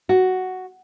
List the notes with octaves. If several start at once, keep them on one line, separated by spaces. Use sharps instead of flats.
F#4